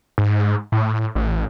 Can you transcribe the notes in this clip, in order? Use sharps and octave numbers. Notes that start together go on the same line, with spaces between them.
G#2
A2
A1